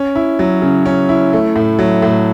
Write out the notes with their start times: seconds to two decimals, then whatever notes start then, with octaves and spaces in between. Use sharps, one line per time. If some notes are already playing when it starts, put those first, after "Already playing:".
Already playing: C#4
0.15 E4
0.39 F#3
0.62 C#3
0.86 C#4
1.09 E4
1.33 A3
1.56 A2
1.79 F#3
2.02 A2